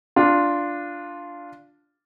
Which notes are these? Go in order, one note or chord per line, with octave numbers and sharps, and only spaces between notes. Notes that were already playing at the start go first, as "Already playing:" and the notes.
D4 F4